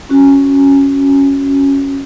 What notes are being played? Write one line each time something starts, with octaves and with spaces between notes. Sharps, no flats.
C#4 F#4